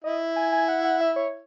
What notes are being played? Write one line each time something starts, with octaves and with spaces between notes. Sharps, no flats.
E4 D#5
G#5
G#5
F#5
F#5
E5
C#5